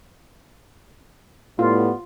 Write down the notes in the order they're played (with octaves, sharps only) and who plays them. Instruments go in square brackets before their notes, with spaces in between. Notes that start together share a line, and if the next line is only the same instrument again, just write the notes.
[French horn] A2 [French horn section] G3 B3 [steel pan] F4